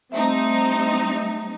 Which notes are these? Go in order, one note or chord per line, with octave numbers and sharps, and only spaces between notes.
G3 A3 C4 D#4 E5